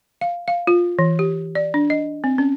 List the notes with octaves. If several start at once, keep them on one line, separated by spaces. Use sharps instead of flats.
F5
F5
F4
E3
G4
D5
D4
D#5
C4
C#4